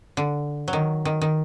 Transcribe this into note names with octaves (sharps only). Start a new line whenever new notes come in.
D3
F#3
D#3
D#3
D#3